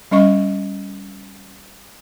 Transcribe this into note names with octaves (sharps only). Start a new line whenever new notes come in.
G3 C#4 D#5 C#6